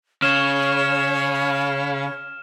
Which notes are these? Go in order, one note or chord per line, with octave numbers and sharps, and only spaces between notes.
C#3 C#5 F6 E7